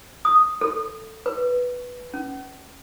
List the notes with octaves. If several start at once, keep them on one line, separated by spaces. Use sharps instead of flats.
D#6
A4
B4
C#4